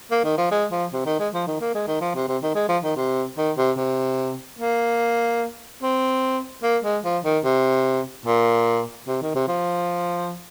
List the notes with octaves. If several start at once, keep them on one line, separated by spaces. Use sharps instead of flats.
A#3
D#3
F3
G#3
F3
C3
D#3
G#3
F3
D#3
A#3
G#3
D#3
F3
C3
C3
D#3
G#3
F3
D#3
C3
D#3
C3
C3
A#3
C4
A#3
G#3
F3
D#3
C3
A#2
C3
D#3
C3
F3